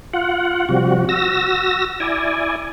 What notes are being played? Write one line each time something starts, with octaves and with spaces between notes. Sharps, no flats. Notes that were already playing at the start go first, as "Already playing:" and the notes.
F4 F#5
C3 F3 G3 F#4
F#4 E6 A#6
E4 D5 G#5